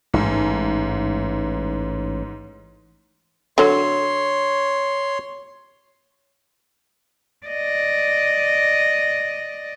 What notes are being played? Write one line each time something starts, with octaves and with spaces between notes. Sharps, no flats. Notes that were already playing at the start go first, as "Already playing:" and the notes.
A1 G#2
D3 F#3 C#5 C6
D5 D#5